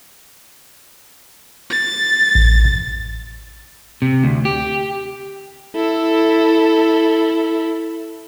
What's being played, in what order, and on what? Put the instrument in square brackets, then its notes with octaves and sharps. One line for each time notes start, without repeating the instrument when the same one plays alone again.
[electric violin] A6
[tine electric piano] A1
[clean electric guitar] C3
D2
G4
[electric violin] E4 A4